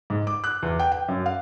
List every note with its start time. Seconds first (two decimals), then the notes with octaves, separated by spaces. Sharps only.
0.10 G#2
0.27 D6
0.44 F#6
0.63 E2
0.79 G5
0.92 G5
1.08 F#2
1.26 F5